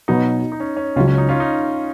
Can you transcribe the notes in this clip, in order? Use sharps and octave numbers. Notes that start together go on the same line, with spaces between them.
B2 F#3 B3 D#4 F#4 B4
D#4
C#4
C#4
C#2 C#3 F#3 C#4 F4
C#4
D#4
C#4 F4
D#4